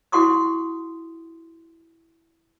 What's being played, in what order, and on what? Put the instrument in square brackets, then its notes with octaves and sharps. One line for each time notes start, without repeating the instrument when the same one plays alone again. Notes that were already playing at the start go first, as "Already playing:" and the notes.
[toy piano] E4 F#4 F#5 C6 C#6 D#6